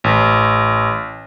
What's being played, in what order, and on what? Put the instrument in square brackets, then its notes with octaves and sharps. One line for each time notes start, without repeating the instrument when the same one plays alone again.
[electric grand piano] A1